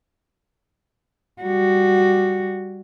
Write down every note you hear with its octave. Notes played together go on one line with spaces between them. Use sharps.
G3 F#4